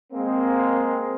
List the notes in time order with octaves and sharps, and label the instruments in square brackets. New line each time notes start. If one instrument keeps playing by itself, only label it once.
[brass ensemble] G#3 A#3 C4